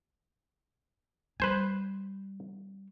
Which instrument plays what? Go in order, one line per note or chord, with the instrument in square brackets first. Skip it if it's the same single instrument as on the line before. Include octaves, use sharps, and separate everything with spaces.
[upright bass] G3 [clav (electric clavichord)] B4 C5 G#5